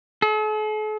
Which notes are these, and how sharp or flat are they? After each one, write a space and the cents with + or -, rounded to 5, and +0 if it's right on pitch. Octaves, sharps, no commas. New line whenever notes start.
A4 -45